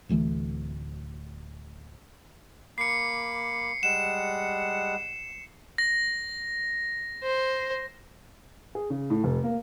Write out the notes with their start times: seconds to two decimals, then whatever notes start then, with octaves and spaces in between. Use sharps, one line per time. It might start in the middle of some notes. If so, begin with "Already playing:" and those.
0.09 D1 D2 E3 A3
2.78 A#3 B5 D6 C7 C#7
3.83 G3 G#3 F#5 E7
5.78 A#6
7.23 C5
8.75 G#4
8.90 C#3
9.10 A2
9.24 F1
9.44 A#3